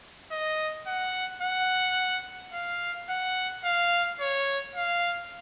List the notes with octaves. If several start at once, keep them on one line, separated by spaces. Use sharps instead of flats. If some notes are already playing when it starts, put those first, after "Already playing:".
D#5
F#5
F#5
F5
F#5
F5
C#5
F5